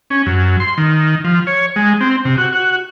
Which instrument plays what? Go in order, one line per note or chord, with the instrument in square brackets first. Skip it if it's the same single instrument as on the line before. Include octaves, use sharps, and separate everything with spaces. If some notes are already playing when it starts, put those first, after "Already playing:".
[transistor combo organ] C#4
F#2
C6
D#3
F3
C#5
G#3
C4
C3
F#4
F#4